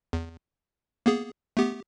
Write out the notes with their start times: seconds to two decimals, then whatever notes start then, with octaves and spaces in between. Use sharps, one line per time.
0.13 E2
1.06 A#3 B3 G#4
1.57 A3 B3 G4